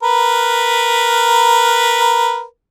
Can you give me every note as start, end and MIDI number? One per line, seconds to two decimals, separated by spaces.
0.03 2.43 70
0.03 2.43 71